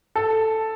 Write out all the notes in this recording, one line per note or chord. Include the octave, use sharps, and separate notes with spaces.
A4